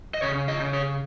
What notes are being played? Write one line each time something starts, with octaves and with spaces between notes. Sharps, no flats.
D#5
C#3 C#5
D#5
C#3
C#5